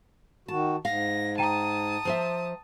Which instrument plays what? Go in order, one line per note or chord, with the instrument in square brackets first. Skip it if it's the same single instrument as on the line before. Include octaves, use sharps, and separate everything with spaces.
[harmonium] D#3 F#4 [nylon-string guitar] A5
[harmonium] G#2 [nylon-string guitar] F5 [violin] A#6
[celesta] G5 A#5 D#7 [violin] A5 D#6
[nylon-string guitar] F3 C5 E5